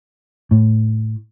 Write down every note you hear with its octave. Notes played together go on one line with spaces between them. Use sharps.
A2